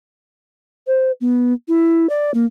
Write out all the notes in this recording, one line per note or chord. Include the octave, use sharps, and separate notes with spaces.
C5
B3
E4
D5
A#3